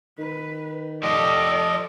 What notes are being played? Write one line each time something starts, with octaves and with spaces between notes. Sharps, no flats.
D#3 B4
F3 G4 A4 D5 D#5